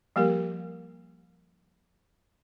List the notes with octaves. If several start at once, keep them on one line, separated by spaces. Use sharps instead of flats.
F3 G3 A#3 G4 A#4